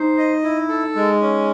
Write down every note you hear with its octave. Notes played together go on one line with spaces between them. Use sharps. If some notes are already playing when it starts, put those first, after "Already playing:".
Already playing: D#4 C5
D#5
E4
A4
G#3
C#4